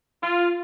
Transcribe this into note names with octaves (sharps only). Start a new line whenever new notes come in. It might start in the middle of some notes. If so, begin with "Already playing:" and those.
F4